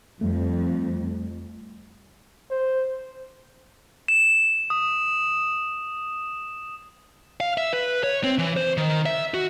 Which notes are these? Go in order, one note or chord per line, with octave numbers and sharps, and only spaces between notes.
F2 G3 A3
C5
E7
D#6
F5
E5
B4
C#5
C4
E3
C5
D#3
E5
F#4